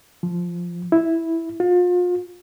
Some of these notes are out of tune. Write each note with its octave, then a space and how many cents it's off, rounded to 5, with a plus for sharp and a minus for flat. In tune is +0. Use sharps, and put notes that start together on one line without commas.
F3 -5
E4 -5
F4 +35